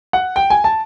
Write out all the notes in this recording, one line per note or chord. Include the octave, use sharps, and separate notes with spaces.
F#5
G5
G#5
A5